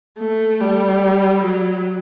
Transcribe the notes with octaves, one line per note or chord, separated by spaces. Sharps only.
A3
G3
F#3